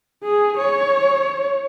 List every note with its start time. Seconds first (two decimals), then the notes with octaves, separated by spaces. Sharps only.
0.24 G#4
0.57 C#5